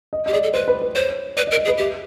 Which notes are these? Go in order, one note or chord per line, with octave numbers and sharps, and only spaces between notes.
D#5
G4 D#5
G#4 D5
A4
B4 C5
B4
B4
C5 C#5
B4 D5
D#5
A#4
D#5
G#4
B4
G4 E5